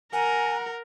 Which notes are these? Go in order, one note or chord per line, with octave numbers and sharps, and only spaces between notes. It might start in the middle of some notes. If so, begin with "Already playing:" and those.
A#4 F#5 G#5 A#5